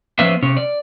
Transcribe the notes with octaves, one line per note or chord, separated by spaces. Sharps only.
F3 B3 C#4 B4 C5 E5
C3 C#4
D5